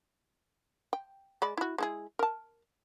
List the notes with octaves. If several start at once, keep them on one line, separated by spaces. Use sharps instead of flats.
G5
G#3 D5 B5
E4 F#4
G#3 E4 G#4
A#4 A5